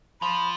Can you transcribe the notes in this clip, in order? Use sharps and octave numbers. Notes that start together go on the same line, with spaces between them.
F3 B5